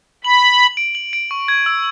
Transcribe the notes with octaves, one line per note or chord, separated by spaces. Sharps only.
B5 F#7
F#7
F#7
D7
F#7
D7
C#6
G#6
E6